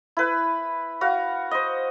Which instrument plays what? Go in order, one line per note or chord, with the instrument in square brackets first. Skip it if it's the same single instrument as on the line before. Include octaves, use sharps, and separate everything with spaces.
[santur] E4 B4
F#4 F5
C5 D#5